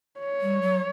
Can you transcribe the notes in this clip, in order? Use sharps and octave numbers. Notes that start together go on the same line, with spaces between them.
C#5
G3
F#3